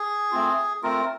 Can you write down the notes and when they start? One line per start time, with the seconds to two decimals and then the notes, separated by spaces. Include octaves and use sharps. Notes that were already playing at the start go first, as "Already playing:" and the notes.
Already playing: G#4
0.31 A3 C4 F4
0.83 A3 C4 F4 A#4